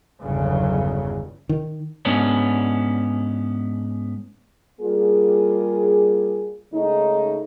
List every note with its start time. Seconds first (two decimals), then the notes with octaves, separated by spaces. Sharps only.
0.20 G1 E2 C#3 F#3
1.49 D#3
2.05 G#2 B3 C#4 D4
4.81 G3 A#3 F4 G#4
6.73 C#3 G#3 A3 D#4